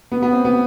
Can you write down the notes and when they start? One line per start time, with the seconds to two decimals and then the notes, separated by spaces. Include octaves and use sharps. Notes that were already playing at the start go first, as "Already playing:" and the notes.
0.12 B3
0.22 B3
0.33 C4
0.45 B3